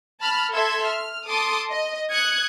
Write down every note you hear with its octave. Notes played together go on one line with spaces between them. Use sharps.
A5 B5 F6
A4 E5 C6 G#6
F6
A4 A5 C6 D6 D#6
D#5
D#6 F#6 G#6 C#7